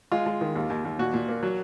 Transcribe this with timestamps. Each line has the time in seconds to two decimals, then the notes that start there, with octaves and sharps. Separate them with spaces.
0.12 G#3 F4
0.26 G#3
0.41 D#3
0.55 D#2
0.70 D#2
0.85 D#2
0.99 A#2 F#4
1.14 A#2
1.29 A#3
1.43 F#3